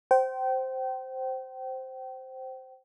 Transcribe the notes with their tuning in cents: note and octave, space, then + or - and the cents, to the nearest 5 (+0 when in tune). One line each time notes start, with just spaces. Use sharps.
C5 +0 G5 -30